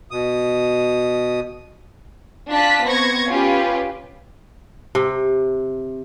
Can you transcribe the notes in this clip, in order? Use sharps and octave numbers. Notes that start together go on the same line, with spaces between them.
B2 D#6
D4 F4 A5 F#6 B6
B3 C4 C5 C#6 G#6 A#6
C#4 F4 G4 B4
C3